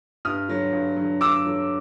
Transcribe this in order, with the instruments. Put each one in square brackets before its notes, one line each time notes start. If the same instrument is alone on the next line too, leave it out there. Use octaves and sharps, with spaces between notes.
[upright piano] G2 [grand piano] D#6 F6
[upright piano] D3 F#3
G2
D3 F#3
[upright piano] G2 [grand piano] D6 E6
[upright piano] D3 F#3